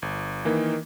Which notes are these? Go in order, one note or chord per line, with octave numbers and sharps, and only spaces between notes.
G1
D#3 E3 A#3